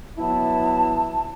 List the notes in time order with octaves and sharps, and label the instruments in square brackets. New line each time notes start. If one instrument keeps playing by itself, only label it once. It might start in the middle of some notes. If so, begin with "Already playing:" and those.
[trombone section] F#3 B3 E4 [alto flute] A5